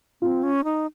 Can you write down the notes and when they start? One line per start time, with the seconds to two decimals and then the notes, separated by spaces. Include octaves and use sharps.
0.22 C4 F4
0.43 C#4
0.64 D#4